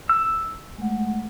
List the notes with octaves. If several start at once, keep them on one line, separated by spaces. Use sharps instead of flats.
E6
G#3 A3 F#5